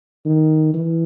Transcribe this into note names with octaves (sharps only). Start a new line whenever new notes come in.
D#3
E3